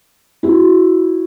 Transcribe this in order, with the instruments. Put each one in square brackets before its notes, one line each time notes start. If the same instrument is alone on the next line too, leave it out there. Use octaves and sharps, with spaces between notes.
[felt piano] E4 F#4